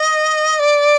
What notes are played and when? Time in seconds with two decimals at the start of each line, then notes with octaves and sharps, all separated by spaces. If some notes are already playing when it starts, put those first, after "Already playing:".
Already playing: D#5
0.59 D5